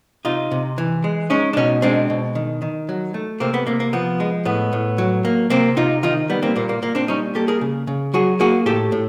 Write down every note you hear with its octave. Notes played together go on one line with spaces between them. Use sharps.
C3 D#4 F4
C3
E3
G#3
G#3 C#4 D#4
D4
B2 C#4 D#4
G#3 C4 D4
B2
D#3
D#3
F#3
A3
C3 A#3 C4
B3
C3 A#3
A#3
F3 B3
G#3
A2 B3
A2
F#3
A#3
C3 A#3 C4
C3 D#4 F4
D#3 D#4 F4
G3 B3
A#3 C4
A#2 A#3
A#3
A#2 A#3
C4 D4
G3 C#4 D#4
A#3 G4 A4
G#4 A#4
C#3
C#3
F#3 F#4 G#4
A#3 F#4 G#4
A2 G4 A4
A2